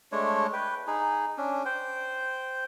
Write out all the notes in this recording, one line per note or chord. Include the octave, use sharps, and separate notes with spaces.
G#3 A3 D4 C#5
B4 G5
D#4 G#4
C#4 D4
C5 G5